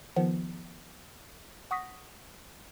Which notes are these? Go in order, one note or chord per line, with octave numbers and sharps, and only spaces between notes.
D#3 F3 B3
F#5 C#6 D#6 A#6 B6